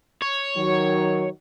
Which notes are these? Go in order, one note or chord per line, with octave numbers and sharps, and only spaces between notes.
C#5
D#3 F#3